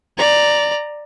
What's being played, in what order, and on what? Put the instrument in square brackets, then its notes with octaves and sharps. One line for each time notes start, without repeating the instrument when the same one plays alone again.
[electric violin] D5 A#5